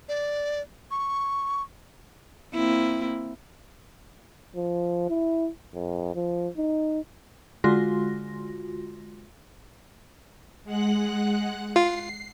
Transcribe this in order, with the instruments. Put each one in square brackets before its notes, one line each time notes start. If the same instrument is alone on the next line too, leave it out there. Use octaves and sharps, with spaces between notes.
[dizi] D5
C#6
[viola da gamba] A#3 C4 E4
[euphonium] F3
E4
F2
F3
D#4
[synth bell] D3 G#3 F4 F#4 C6 A#6
[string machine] G#3 F#5 F#6
[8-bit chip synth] F4 [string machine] C7